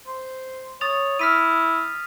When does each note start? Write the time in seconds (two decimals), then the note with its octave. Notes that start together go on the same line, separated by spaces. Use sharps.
0.07 C5
0.81 C#5 D#6 A6 F7
1.19 E4 F6 B6 D#7